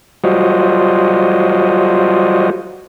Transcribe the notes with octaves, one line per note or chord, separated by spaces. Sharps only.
F#3 G3 F4 F#4 C5 D#5